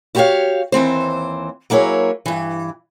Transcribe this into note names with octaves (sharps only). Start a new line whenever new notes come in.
E4 F#4 G4 C5 C#5 F5
D#2 E3 C4 C5
F#3 A#3 E4 G#4 C#5
G2 E3